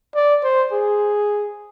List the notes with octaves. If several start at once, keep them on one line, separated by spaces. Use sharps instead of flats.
D5
C5
G#4